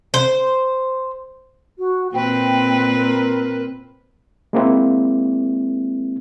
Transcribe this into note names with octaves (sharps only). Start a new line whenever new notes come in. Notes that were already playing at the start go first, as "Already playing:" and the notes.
C5
F#4
A#2 C4 B4 G5
A#4
G#3 A#3 C4 E4